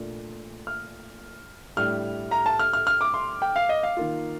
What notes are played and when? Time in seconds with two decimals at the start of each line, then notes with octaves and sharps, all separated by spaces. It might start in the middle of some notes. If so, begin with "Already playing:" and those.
Already playing: A#2 A3 D4 F4
0.67 F6
1.77 A2 G3 D4 F6
2.31 A#5
2.46 A5
2.59 F6
2.73 F6
2.87 F6
3.01 D6
3.14 C6
3.42 G5
3.56 F5
3.69 D#5
3.83 F5
3.97 D#3 A#3 F4